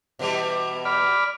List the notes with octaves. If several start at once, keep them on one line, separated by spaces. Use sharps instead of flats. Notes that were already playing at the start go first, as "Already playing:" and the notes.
B2 E3 G3
D5 B5 F6